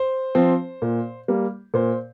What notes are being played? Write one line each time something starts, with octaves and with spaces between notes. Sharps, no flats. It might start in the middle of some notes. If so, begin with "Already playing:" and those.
Already playing: C5
F3 C4
A#2
G3 A#3
A#2 C5